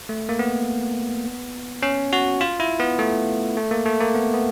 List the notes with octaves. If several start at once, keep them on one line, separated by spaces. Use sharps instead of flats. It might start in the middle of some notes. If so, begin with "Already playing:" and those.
A3
A#3
B3
C#4
F#4
F4
E4
B3
A3
A3
A#3
A3
A#3
B3
B3